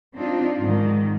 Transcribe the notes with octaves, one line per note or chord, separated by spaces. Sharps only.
C4 D4 D#4 F4
G#2 D#3